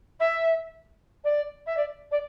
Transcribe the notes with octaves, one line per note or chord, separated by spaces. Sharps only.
E5
D5
E5
D5
D5